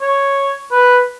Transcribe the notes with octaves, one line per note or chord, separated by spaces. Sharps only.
C#5
B4